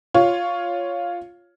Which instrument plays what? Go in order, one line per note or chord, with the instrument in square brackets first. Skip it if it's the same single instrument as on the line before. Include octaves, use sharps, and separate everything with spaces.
[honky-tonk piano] F4 C#5